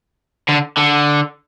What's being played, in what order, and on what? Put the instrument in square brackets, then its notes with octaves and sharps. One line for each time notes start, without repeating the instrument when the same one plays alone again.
[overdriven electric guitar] D3
D3